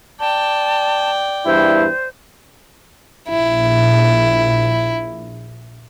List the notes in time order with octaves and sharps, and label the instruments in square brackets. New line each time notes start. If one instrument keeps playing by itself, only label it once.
[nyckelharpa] D5 G5 [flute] A5
[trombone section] E2 G2 E4 [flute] C5
[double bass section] A#1 [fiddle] E4